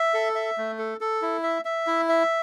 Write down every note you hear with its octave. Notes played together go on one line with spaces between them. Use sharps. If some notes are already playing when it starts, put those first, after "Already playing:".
Already playing: E5
A4
E5
A3
A4
A4
E4
E5
E5
E4
E5